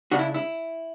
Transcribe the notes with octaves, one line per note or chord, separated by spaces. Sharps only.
C#3 G#3 D4 F#4
E4
E4